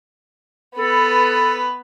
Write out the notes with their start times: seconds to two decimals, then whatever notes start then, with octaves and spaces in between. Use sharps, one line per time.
0.78 B3 A4 B4